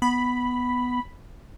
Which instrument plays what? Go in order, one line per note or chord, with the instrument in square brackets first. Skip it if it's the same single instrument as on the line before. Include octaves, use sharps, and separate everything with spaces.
[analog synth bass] B3 [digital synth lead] B5